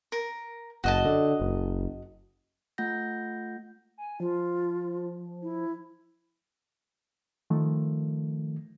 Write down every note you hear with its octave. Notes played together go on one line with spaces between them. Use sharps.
A#4
F#1 F#4 D#5 A5
D3
F#1
A3 F4 F#5 G6 A#6
G#5
F3 F4
E4
D#3 F3 A3